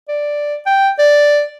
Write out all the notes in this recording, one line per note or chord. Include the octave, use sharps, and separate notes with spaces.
D5
G5
D5